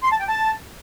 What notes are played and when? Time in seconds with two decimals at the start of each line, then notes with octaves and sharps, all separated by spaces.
0.04 C6
0.12 A5
0.20 G5
0.29 A5